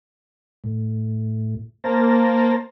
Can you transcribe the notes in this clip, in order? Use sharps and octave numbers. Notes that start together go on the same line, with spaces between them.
A2
A#3 C5 A5 A#5